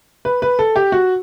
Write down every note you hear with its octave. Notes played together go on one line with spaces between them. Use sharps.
B4
B4
A4
G4
F#4